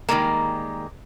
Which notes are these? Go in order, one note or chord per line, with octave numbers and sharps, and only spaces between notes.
D#3 E3 G3 G#3 A#3